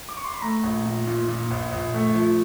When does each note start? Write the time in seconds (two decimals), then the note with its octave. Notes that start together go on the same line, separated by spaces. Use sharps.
0.09 D6
0.17 C#6
0.25 C6
0.34 B5
0.42 A3 A#5
0.63 A#1
0.85 A#2
1.07 A#2
1.28 A#2
1.51 A#1
1.72 A#1
1.94 A3
2.15 F3